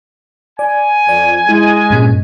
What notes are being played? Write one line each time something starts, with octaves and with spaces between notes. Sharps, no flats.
D5 G#5
F2 D5
G#3 E4
G2 A#2 C#4